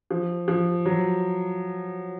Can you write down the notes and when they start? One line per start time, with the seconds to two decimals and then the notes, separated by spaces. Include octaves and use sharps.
0.11 F3
0.48 F3
0.86 F#3